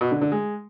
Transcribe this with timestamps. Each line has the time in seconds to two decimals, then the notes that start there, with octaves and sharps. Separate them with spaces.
0.01 B2
0.11 D3
0.21 D3
0.32 G#3